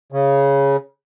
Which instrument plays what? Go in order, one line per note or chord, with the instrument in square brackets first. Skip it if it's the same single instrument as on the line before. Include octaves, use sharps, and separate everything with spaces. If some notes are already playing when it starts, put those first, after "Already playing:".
[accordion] C#3